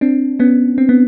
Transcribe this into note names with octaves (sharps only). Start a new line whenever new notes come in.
C4 D4
B3 C#4
C4
B3